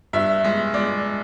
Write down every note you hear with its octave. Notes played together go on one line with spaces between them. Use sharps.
G2 E5
G#3
G#3 D5